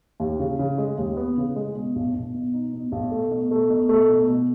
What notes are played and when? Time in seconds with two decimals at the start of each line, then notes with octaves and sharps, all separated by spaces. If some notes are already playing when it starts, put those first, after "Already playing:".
0.20 D#2
0.39 C#3
0.59 C#3
0.78 G#3
0.97 D#2
1.17 B3
1.37 C#3
1.56 G#3
1.75 B2
1.96 B1
2.15 B1
2.34 B2
2.54 D#4
2.73 B2
2.92 B1
3.12 A3
3.31 B2
3.51 A3
3.70 B2
3.89 A3
4.09 B2
4.28 B2